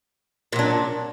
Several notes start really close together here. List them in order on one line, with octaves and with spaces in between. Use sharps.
A#2 F#3 D4